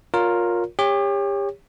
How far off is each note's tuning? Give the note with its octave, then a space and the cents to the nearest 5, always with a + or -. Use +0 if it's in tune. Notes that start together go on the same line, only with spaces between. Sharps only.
F4 +20 A#4 +0 C#5 +15
G4 +35 C#5 +0